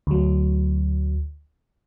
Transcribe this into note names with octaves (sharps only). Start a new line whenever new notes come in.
D2 F#3